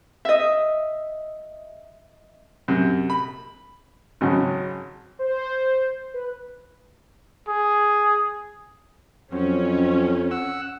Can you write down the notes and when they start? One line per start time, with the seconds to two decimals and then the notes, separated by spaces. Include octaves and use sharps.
0.25 D#5 E5
2.68 F#2 C3
3.10 B5
4.21 G#1 G#2 C#3 F#3 C#4
5.19 C5
6.14 B4
7.48 G#4
9.32 F2 F#3 C4 C#4
10.31 F#5 E6